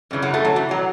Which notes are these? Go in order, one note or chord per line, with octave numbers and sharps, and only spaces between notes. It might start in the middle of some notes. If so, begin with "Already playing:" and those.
F#2 C#3 E3
F#3
A3
F#3
E3
F#3